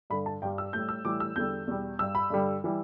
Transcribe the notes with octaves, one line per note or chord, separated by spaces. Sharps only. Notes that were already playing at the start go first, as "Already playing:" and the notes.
G2 D3 G3 B5
A5
G2 G3 G5
E6
A2 G3 G6
E6
A2 E3 G3 D6
E6
E2 D3 G3 G6
E2 B2 G3
G2 G3 E6
B5
G2 D3 G3
E3 G3